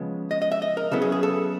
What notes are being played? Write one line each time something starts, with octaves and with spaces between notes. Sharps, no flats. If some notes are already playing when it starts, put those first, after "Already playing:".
Already playing: C#3 F3 G#3 B3
D#5
D#5
E5
D#5
A#4
C#3 F#3 B3 E4 A4
G#4
G#4
A4